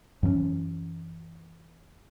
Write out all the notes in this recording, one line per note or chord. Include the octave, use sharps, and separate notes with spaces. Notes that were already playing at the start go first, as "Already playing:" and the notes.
F#2 E3 B3 C#4